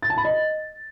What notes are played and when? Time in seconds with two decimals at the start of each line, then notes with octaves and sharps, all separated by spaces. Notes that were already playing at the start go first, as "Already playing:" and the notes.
0.02 A6
0.10 A5
0.17 B5
0.25 D#5